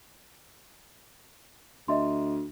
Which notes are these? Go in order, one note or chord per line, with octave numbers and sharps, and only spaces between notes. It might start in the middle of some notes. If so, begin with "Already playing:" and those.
D2 D#5 E5 C6